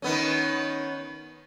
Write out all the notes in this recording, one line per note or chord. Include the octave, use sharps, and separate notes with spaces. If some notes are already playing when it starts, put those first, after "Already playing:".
D#3 B3 C#4